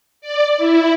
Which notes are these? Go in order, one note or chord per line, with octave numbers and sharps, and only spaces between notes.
D5
E4